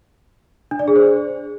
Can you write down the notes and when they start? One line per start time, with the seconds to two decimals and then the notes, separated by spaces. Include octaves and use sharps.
0.71 D4
0.79 D5
0.88 G#4
0.96 C5